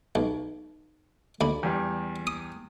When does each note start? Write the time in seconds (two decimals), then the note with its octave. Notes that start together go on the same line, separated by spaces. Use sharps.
0.15 B1
1.41 D2 B5
1.63 E2 G3
2.27 D#6